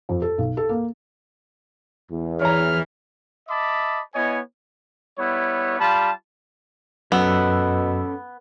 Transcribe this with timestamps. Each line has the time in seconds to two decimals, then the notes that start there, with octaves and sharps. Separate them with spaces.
0.09 F2
0.22 A4
0.38 B1
0.57 A4
0.69 A#3
2.11 E2
2.42 E3 C#5 A#5 F6
3.48 D#5 E5 A5 B5 D6
4.14 B3 E4 C#5 D#5 G#5
5.18 G3 B3 E4 C#5
5.79 G3 F4 A5 B5
7.12 F#2 B2 B3 C#4 A4 E6